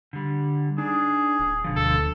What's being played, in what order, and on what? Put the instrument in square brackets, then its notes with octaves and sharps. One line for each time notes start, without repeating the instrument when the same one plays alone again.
[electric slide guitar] D3 G3
[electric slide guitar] D4 [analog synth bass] D#4 [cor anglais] G#4
[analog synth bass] D#1
[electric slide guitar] B2 D3 F3
[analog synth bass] D2 [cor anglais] A4